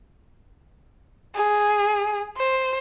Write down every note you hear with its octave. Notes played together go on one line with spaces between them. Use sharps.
G#4
C5